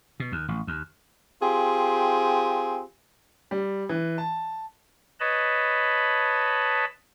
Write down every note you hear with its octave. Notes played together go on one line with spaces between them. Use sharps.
B2
D#2
A1
D#2
C4 F4 G4 G#4
G3
E3
A5
B4 C#5 D#5 A5 B5